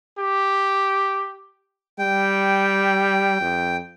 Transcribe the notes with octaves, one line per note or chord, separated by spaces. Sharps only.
G4
G3 G5
F2